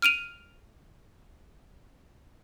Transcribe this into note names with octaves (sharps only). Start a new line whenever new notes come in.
F6 D7 D#7 F7